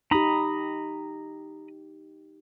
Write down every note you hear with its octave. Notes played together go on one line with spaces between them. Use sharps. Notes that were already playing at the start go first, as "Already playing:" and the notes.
D#4 G4 A#5 B5 D#6